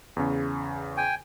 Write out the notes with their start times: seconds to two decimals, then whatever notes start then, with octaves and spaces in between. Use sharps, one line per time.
0.17 E2 C#3
0.97 G5 G#5